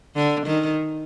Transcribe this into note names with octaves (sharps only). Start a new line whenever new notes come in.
D3
D#3